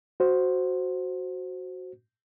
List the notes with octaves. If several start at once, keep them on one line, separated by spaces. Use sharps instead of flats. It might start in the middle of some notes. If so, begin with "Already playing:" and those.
F#4 C5